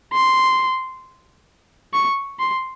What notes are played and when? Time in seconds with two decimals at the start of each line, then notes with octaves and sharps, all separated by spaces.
0.13 C6
1.94 C#6
2.39 C6